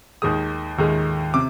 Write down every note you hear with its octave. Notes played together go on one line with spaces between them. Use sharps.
D#2 D#3 G#3 D#6
D#2 D#3 G#3
C3 D6